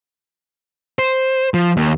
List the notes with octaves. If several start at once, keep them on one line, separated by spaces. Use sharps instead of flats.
C5
F3
D#2